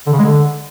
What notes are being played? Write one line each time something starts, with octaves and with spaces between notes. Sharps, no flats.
D3
C#3
G#3
D3